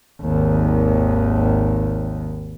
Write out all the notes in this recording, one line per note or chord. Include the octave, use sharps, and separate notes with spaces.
G#1 D#2